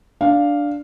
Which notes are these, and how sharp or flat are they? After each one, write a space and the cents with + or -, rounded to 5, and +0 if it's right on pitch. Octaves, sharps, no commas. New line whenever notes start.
D4 +0 F5 +0